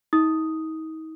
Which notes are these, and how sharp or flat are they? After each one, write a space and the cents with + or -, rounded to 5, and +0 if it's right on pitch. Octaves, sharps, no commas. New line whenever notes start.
D#4 +40 D#6 +0